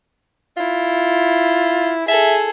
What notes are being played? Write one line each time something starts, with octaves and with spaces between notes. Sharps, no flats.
E4 F4
G#4 A4 E5